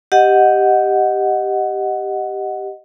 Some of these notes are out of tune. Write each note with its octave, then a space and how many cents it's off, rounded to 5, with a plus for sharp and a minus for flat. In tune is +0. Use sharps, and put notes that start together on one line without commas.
G4 +0 D#5 +0 F#5 +0